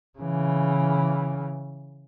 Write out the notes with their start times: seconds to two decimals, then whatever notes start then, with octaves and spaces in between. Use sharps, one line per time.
0.19 C#3 E3